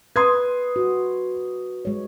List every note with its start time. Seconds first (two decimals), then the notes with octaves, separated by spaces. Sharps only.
0.16 B4 C6 D#6 G#6
0.76 F#4
1.85 G#3 C#5